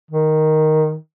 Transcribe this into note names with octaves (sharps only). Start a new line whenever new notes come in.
D#3